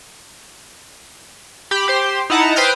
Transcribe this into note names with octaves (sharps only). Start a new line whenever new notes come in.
G4 B5
G4 C5 C6
D#4 E4 F#5 A5 A#5
B4 C5 G5 D#6 F6 G6